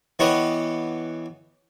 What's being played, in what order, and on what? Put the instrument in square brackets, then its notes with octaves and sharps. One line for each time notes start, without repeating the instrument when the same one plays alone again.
[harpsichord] E3 B3 G4 B4 C#5 D#5